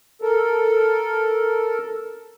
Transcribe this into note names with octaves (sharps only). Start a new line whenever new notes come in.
A4 A#4